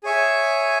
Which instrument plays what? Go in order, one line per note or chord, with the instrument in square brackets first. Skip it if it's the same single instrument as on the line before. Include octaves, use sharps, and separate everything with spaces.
[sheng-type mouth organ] G#4 C#5 E5 G#5